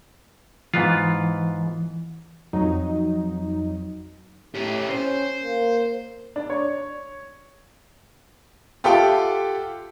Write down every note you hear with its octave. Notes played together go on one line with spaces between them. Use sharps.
G#2 E3 B3 F4
F2 F#3 D#4
A2 C#4 G4
C#4 C5
A#3
D4
C#5
F4 G4 A4 E5 F#5 G5